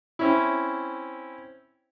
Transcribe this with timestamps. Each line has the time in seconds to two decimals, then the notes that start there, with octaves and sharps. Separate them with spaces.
0.19 C4 C#4 E4